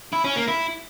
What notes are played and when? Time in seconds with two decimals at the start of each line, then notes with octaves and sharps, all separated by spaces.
0.13 E4
0.24 C#4
0.36 A#3
0.48 E4